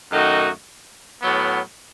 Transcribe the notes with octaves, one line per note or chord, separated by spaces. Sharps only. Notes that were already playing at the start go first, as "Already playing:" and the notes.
F#2 D#3 A3 D#4 F#4
A2 F#3 B3